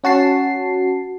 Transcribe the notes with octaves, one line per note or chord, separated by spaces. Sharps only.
C#4 F#4 A5 C7